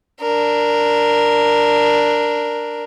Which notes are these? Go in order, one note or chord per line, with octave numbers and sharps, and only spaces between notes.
D4 A#4